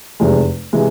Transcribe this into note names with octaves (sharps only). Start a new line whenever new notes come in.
F1 E2 C3 G#3
C3 E3 G#3